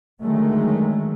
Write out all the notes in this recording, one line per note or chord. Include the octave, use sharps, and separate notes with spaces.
D3 D#3 F#3 G#3 A3